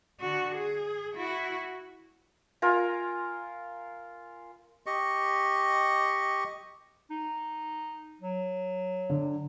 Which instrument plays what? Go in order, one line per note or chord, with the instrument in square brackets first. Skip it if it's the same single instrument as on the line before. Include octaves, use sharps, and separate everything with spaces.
[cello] D3 F#4
G#4
E4 F#4
[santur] F4 A#4 G#5 A#5
[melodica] G4 D#5 C#6
[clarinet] D#4
F#3
[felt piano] D3